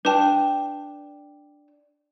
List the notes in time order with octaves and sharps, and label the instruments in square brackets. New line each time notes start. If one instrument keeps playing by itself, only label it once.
[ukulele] D4 G5 [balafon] B4 A5